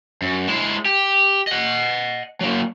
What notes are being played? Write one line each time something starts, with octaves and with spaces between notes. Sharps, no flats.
F#2
G#3 E4
G4
D#5 F#5
F#3 A#3